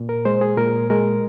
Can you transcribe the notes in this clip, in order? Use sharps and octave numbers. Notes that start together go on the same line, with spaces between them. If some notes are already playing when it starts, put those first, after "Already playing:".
Already playing: A#2
A#4
G#3 C5
G#4
A#2 A#4
G#3 A#4